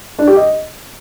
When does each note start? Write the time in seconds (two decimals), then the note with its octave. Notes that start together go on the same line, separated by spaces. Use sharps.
0.19 D4
0.27 G4
0.36 D#5